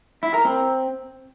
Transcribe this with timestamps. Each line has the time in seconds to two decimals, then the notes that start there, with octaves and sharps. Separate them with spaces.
0.23 E4
0.34 A#4
0.45 C4